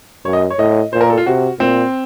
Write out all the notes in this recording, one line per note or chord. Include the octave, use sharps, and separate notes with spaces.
F#2 C#5
D#5
C#5
A2 D#5
A#2 C5
A#4
A4
F4
C3 F#4
A#2 C4